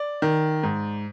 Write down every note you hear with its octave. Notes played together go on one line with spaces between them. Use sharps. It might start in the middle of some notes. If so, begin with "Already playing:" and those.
Already playing: D5
D#3
G#2